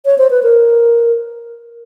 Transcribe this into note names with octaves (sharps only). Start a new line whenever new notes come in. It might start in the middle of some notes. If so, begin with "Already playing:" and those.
C#5
C5
B4
A#4